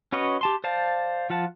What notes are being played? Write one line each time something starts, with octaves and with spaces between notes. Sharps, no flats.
C#4 F#4 B4 C#5 D#5
G4 A5 C6
C5 D5 F5 A5
F3 F4 F#5 A5